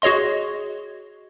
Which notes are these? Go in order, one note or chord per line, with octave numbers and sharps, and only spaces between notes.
F#4 G#4 C#5 D#5 C6